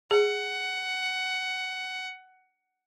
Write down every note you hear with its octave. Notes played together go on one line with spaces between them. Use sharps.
G#4 F#5